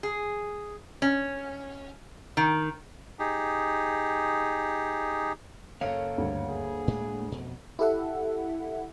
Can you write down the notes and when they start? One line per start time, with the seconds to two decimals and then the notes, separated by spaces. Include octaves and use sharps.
0.03 G#4
1.02 C#4
2.37 D#3
3.19 D#4 G4 G#4
5.81 F#2 C#3 A#3 A4 C#5 F5
6.18 D2 G2
6.49 G#4
6.88 A2 G#3 D4
7.32 F2 B2
7.79 E4 G4 A4 E5 F#5